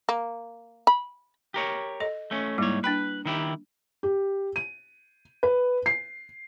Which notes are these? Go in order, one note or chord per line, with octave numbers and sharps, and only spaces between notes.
A#3
B5
G4 A#4 C#5
A4 D#5
A3 C#4
G#2 G3 A#3 E4 C#5
D4 B4 G5 B5
D#3 E4 G4
G4
D#7
B4
C7